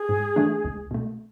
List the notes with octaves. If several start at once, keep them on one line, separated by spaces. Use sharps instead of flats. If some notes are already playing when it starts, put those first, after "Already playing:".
Already playing: G#4
G#2
E3 A3 D4
C#2
B2 A3